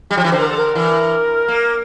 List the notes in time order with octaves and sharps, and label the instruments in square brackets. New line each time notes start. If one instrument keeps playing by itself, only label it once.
[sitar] G3
F3
E3
[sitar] D3 [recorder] C5
[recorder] A#4
A4
A#4
[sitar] E3
A#3